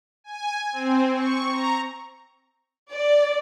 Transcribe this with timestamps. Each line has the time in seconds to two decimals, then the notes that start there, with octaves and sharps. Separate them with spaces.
0.24 G#5
0.72 C4
1.12 C#6
1.51 A#5
2.91 D5